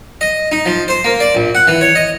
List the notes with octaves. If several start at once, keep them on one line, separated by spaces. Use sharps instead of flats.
D#5
D#4
F3
C5
A#3
D5
A#1
F#5
E3
C#5
D#5